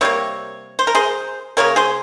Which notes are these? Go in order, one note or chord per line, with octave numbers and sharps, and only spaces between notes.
C3 G3 A#3 C#5
C5
A#4
G#4 C5
C#3 G3 A#3 A#4 C#5
G#4 C5